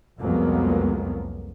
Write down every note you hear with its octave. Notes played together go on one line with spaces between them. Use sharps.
C2 F2 F#3 G#3 A#3 B3